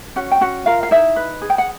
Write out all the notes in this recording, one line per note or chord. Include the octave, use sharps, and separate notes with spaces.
C#4 F#4 F#5
G5
C#4 F#4 F#5
F4 A#4 F5
F5
D#4 E4 E5
B4
G#4
G5
F#5